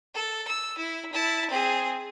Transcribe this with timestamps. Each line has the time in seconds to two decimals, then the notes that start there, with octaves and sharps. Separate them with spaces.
0.15 A4
0.48 E6
0.78 E4
1.13 E4 A5
1.50 C4 G#4